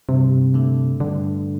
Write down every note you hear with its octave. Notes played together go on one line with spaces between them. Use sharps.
G2 C3
D3 A3
G2 D3